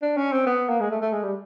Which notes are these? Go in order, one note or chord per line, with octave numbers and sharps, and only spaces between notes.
D4
C#4
C4
B3
A#3
G#3
A3
A3
G#3
G3